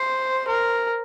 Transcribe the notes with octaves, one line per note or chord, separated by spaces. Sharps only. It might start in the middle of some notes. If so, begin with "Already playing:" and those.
Already playing: C5
A#4